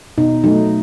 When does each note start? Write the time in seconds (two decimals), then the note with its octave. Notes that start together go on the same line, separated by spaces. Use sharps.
0.18 B2 D#4
0.44 F#3 A3 D#4